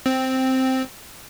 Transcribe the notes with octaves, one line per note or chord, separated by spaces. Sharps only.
C4